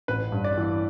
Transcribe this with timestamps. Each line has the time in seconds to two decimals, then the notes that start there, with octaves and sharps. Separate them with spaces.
0.08 A1 B4
0.32 G2
0.44 D5
0.58 E3